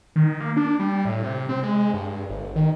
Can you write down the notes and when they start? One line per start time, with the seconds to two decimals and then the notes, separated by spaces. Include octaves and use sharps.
0.16 D#3
0.40 A#3
0.57 D4
0.80 G3
1.05 A2
1.23 C3
1.49 C4
1.63 G#3
1.94 G2
2.29 G1
2.56 D#3